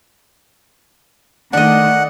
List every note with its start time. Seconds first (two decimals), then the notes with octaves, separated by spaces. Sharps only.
1.53 D#3 A3 D4 D#5 F#5